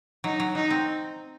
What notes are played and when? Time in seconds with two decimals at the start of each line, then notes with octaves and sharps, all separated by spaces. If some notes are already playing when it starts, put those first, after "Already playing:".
0.24 F#3 D#4
0.40 F#3
0.55 F#3 D#4
0.71 C4